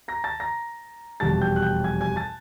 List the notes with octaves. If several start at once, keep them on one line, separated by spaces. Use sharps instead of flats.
A#5 A#6
A5 A6
A#5 A#6
F1 E2 B2 G3 A5 A6
G5 G6
F#6
G5 G6
G#5 G#6
G#5 G#6
A5 A6